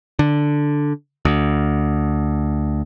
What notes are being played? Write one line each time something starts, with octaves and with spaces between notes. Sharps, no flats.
D3
D2